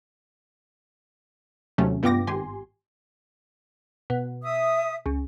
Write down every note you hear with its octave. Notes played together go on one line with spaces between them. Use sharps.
D#2 C3 F#3 A3 C#4
G2 B3 F4 G5 D6 A#6
G#1 G4 G#5 C6
B2
E5 D#6
C#2